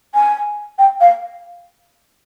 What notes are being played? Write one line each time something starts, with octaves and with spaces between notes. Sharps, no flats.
G#5
G5
F5